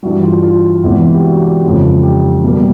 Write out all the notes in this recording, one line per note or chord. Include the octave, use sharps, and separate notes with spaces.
G2 E3 G3 F#4
F4
F4
E2 C3 E3 G#3 B3
G4
F#4
G4
F2 C#3 F3 G#3
G4
B2 G3 A#3